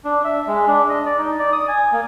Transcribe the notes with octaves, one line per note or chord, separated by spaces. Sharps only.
D4
E5
G#3
D4
D#5
D5
D#4
D5
D#6
G#5
A#3